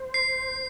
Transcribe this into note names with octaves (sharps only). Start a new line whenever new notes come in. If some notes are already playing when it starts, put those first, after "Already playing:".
Already playing: C5
C7